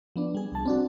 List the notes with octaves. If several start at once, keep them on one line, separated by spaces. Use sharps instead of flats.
F3 B3 D4
G3 G#4
C2 A5
C4 D4 F#4